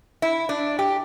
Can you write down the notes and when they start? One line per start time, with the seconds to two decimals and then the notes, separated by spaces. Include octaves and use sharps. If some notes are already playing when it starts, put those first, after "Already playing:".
0.22 E4
0.49 D4
0.79 G4